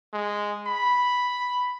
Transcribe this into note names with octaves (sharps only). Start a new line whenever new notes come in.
G#3
B5